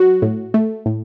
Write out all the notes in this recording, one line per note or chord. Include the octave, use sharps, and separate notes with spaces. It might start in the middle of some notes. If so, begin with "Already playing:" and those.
Already playing: F#3 F#4
A2
A3
A2